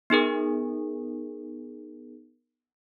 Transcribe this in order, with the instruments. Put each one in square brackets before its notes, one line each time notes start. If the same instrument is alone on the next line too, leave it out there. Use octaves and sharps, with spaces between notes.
[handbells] B3 D#4 G#4 A#4